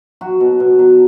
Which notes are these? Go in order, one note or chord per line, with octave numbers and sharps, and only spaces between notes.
F#3 F#4
B2
B2
F#3